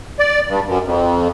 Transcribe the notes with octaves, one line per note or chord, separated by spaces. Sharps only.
D5
G2
F#2
F2